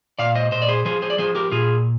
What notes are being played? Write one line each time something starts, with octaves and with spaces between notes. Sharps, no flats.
A#2 D5 F5
C5 D#5
A#2 C5 D#5
D5
G#4 C5
F3 G#4 C5
G#4 C5
D5
F3 G#4 C5
G4 A#4
A#2 F4 G#4